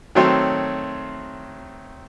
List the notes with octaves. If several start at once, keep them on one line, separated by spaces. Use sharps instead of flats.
D#3 F#3 A3 C4 C5 C#5